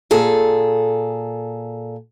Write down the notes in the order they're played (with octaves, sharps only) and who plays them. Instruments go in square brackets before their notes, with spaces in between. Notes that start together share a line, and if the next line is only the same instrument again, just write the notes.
[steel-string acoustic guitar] A#2 G#4 A4